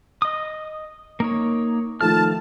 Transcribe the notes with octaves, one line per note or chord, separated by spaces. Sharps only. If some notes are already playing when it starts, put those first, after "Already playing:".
D#5 D#6
A#3 D#4 C#5
D#3 F3 A3 A5 F6